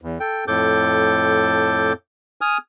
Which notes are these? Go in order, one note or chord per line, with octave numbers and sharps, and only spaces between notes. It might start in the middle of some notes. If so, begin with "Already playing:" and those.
E2
A4 G5
F2 A2 A4 D6 G6
G#5 D#6 F6